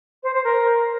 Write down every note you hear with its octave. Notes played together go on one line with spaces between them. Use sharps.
C5
C5
A#4